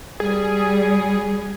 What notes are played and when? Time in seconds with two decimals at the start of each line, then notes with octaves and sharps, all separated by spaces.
0.20 G3 G#4